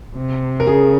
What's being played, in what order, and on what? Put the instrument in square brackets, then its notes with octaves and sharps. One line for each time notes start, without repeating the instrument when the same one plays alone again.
[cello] C3
[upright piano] A#4
[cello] C#3 [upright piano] G#4